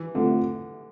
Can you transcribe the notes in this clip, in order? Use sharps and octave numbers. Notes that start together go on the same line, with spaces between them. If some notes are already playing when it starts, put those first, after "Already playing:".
Already playing: E3
D3 F3 A3 C4